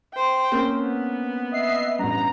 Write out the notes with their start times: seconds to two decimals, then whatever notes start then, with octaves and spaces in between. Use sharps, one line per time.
0.14 C5 G5
0.52 A#3 C4 C#4
0.81 B3
1.52 D#5 E5 C7
1.99 A1 G2 A#5